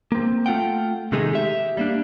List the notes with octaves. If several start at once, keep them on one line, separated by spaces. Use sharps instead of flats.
A#3 C4
A3 F4 F#5 G5
C3 D#3 G#3 A3 D#4 G#4
G4 E5
G3 A#3 D4